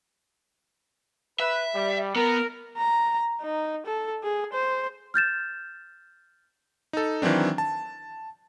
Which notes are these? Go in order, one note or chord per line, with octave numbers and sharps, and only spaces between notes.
B4 E5
G3
B3 A#4
A#5
D#4
A4
G#4
C5
F6 G6 A6 E7
D#4 A4
D#3 E3 F#3 C4 D4
A5